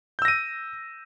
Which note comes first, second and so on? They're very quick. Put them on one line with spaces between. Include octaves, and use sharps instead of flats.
G6 E6 A#6 D#7